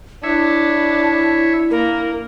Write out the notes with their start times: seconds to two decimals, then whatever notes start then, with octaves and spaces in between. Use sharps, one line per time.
0.24 D4 E4 C#5 E5
1.71 A#3 A#4